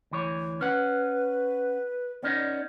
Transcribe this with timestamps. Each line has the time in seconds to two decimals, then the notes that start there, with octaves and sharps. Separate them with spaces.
0.11 D2 E3 C#5
0.61 C#4 B4 F#5
2.23 B3 C#4 D#4 D5